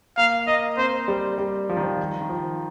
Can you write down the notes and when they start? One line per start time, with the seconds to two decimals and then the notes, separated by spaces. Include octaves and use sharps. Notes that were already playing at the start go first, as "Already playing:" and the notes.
0.17 A#3 F5
0.47 A#3 D#5
0.78 C4 C5
1.08 G3
1.38 G3
1.69 F3
1.77 D#3
1.83 F3
2.21 D#3
2.29 F3